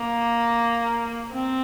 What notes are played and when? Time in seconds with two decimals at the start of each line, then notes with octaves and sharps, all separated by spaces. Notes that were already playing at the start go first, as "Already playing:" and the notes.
Already playing: A#3
1.32 C4